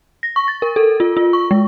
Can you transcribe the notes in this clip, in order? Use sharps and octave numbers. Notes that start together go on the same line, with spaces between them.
A#6
C#6
A6
A#4
A4
F4
F4
C#6
G#3